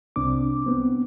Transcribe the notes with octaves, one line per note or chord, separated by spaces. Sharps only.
C2 C4 D4 D6
B3 C4